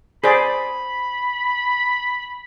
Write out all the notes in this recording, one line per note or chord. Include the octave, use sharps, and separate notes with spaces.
G#4 C5 D5 B5